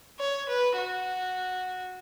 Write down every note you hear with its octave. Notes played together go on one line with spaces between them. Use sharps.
C#5
B4
F#4